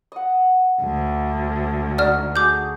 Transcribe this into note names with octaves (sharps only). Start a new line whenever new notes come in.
D#5 F#5
D2
D#4 F#4 D5 F6
F#4 G#4 D6 G6